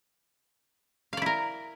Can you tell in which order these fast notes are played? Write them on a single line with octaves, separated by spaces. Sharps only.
F5 D5 E4 A#4